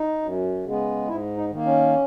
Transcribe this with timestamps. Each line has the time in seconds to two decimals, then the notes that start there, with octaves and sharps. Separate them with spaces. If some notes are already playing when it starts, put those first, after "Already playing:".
Already playing: D#4
0.22 F#2
0.65 C#3 G#3 B3
1.08 G#2 E4
1.37 D#4
1.51 D#3 A#3
1.66 C#4